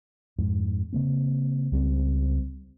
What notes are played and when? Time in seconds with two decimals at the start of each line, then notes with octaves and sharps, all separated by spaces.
0.39 F2 G#2
0.93 C#3 A#3 C4
1.72 C#2 G3 C4